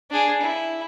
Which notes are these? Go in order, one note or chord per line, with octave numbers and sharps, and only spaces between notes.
D4 G#4
E4